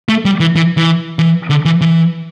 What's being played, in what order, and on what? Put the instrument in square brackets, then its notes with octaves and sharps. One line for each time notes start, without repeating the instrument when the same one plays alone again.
[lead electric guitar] A3
G3
E3
E3
E3
E3
D3
E3
E3